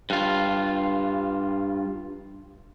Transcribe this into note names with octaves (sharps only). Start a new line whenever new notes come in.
G2 F4